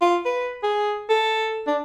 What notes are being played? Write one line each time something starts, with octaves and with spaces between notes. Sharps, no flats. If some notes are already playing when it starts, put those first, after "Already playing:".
F4
B4
G#4
A4
D4